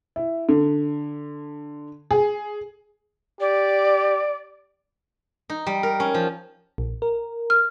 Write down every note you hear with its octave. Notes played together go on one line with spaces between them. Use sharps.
E4
D3
G#4
G4 D5
D#4
G3
A#4
C#4
F3
A#1
A#4
F6